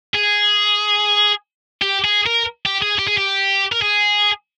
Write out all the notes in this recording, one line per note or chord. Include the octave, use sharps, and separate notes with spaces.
G#4
G4
G#4
A#4
G4
G#4
G4
G#4
G4
A#4
G#4